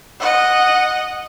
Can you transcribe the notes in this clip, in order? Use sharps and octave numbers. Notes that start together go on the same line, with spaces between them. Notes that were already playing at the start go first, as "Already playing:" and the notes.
D#5 F#5